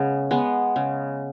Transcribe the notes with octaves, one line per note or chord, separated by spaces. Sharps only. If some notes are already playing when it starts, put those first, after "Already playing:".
Already playing: C#3 G#3 B3
G#3 B3
C#3